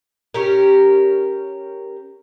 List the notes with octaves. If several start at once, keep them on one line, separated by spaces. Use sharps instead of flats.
C#4 G4 A#4